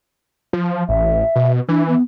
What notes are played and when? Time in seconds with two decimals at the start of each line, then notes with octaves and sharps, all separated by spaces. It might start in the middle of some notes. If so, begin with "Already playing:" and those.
0.53 F3
0.89 A1 E5
1.36 B2
1.68 E3 D4
1.88 B3